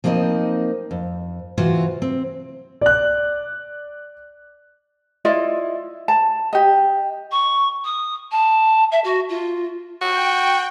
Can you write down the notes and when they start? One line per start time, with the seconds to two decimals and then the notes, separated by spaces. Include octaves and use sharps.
0.04 F3 A#3 C4 D#4 D#5
0.91 F2
1.57 C3 E3 F4 F#4 C5
2.02 C4
2.81 D5 F#6
5.25 E4 F4 D5 D#5
6.08 A5
6.53 G4 D#5
7.31 C#6
7.84 D#6
8.31 A5
8.91 E5
9.04 F#4
9.29 F4
10.01 F#4 G5